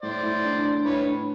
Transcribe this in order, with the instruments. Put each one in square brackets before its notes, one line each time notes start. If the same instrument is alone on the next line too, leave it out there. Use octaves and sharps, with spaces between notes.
[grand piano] A2 [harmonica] C5 D5
[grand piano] A2
D4
D4
[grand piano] A2 [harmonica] B4 C#5
[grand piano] D4